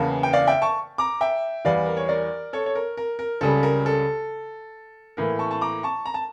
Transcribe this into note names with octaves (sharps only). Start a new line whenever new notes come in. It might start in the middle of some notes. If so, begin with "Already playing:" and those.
Already playing: E2 C#3 E3 A#3 F5 A5
G5
D5 F5
E5 G5
A5 C#6
A#5 D6
E5 G5
E2 E3 G3 D5 F5
A#4
C#5
A#4 D5
A4 C#5
C#5
A#4
A#4
A#4
C#2 C#3 G3 A4
A#4
A4
A2 E3 A#3 A#4
A5 C#6
A5 C#6
A#5 D6
A5 C#6
A#5
A5